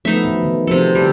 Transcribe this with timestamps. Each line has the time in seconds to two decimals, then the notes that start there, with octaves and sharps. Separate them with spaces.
0.05 F3 A3 B3 D#4 E5
0.25 B2 E3
0.43 D#3
0.67 C3 F3 A4 C5
0.95 D3 G3 A4